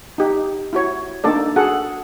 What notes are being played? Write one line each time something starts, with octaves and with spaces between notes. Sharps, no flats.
D#4 G4
E4 F#4 C#5
A#3 D4 D#4 A4 D5
F#4 G#4 A4 F#5